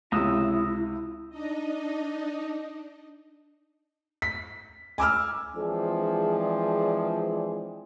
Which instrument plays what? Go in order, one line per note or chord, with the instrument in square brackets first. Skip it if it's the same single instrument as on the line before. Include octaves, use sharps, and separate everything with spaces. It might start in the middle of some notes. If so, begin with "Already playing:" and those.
[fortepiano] C#2 C3 [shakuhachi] E4 [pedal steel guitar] A#5 D#6 E6
[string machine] D4 D#4 D#5
[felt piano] B6
G#5 D6 E6 F6
[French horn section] E3 F3 G#3 C4 D4 G#4